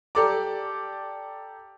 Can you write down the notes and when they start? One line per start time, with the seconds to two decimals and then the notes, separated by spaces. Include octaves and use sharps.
0.15 G4 A4 D5 A#5 D6